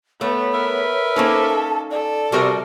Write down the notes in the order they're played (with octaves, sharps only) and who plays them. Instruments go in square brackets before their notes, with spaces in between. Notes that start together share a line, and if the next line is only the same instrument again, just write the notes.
[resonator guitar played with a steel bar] A3 [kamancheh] B3 [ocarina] C#5
[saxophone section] A#4 B4 E5
[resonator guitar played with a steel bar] A#3 C#4 D#4 [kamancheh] A4 [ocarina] C5
[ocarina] A5
[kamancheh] A4 [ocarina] D5
[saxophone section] C3 [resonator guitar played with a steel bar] G3 F#4 A#4